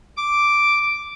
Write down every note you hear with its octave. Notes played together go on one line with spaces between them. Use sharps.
D6